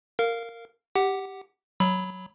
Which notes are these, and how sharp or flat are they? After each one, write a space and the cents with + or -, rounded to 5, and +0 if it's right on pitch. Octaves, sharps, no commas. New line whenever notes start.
A#4 -15 F5 +0
G4 +0 F#5 +15
F#3 +0 B5 +0